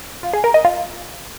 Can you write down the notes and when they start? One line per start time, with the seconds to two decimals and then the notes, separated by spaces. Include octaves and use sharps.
0.23 F4
0.33 G#4
0.44 A#4
0.54 D#5
0.65 F4